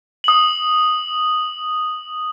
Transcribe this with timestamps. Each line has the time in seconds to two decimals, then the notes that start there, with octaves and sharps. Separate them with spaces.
0.24 D#6 F#7